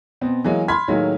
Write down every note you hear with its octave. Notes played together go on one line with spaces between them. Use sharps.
B2 B3 C4
E3 F#3 G#3 A#3
B5 C6 F6 G#6 B6
A2 D#3 F#3 G#3 A#3